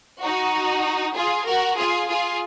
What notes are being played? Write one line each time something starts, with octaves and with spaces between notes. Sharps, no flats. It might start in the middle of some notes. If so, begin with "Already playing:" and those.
D#4 F#4
F4 G#4
F#4 A#4
F4 G#4
F4 G#4